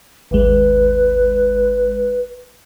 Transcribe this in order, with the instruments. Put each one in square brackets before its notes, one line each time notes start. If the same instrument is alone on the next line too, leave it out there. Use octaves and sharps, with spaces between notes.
[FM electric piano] G#1 D#2 G#3 [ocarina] B4